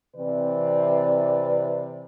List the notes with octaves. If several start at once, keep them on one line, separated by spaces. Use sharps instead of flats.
C3 E3 C4 B4 D5